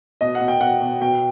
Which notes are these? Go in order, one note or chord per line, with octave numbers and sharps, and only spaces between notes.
B2 D#5
F#5
B2
G5
B2 F#5
B2
B2 G5